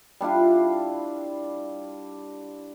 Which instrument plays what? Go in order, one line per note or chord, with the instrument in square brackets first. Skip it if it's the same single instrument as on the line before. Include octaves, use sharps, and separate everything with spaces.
[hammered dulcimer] G3 D4 E4 F4